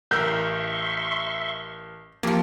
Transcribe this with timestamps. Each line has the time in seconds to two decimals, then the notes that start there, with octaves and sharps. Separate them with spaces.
0.11 A1 A#4 E5 C6 C#6 E6 G6
2.23 F2 F3 A#3 G4